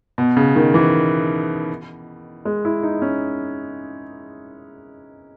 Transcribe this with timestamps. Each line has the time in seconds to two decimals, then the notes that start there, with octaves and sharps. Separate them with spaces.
0.18 B2
0.37 C#3
0.56 D#3
0.74 E3
2.45 G#3
2.65 E4
2.83 D#4
3.02 C#4